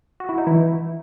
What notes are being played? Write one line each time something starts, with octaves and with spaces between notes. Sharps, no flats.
F#4
E4
D#4
E3 E4